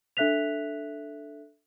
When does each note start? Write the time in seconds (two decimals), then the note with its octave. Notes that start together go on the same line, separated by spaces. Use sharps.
0.17 D4 A4 E5 F#6 B6 F7